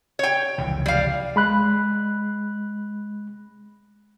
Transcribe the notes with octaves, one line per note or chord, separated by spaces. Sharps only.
C#5 G5
F1 C#2 E3
G3 F5
G#3 B5 F#6